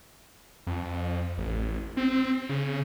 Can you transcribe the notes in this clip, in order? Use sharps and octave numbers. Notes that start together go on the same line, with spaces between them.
F2
A1
C4
C#3